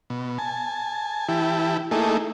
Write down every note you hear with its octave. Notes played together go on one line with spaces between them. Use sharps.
B2
G#5 A5
E3 E4 G4 A5
A3 A#3 D#4 E4 G#4 A4